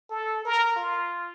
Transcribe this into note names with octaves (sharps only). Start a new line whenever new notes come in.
A4
A#4
F4